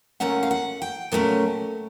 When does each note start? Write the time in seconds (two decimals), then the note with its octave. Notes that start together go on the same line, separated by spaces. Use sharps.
0.20 A#2 F#3 A3 C#4 F#5
0.43 F5
0.51 F#5
0.82 G5
1.12 A#2 F#3 A3 C#4